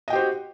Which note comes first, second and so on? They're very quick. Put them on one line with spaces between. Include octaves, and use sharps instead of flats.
D#5 G5 G4 C5 F#4